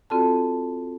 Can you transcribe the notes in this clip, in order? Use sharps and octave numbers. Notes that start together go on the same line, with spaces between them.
C4 F4 F#4 A4 D5 A5